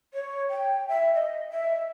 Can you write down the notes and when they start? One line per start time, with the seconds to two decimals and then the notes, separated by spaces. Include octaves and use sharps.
0.14 C#5
0.50 G5
0.88 E5
1.15 D#5
1.50 E5